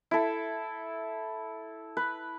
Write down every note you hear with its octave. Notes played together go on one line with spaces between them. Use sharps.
E4 A4
B4